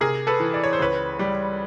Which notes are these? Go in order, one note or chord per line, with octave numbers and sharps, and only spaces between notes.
C3 G#4 A#4
A4 B4
E3
D5
C#5
C5
C#2 B4 C#5
G3